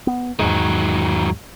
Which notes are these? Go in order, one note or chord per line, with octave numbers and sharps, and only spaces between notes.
B3
E2 G#2 D#3 F#3 G#3